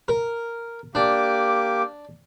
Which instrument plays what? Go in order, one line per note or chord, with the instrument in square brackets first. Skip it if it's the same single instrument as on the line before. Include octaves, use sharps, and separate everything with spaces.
[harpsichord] A#4
[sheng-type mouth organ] A#3 G4 D6 [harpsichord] D4